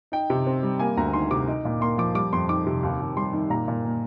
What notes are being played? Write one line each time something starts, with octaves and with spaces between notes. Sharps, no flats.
D#4 G5
C3
C4
G3
A#3 G#5
D2 A#5
D#3 C6
C3 D6
D#4
A#2
A#3 C6
F3 D6
G3 D6
F2 C6
D#3 D6
C3
D#2
D#2
G3 C6
D#3
A#2 A#5
A#2
A#3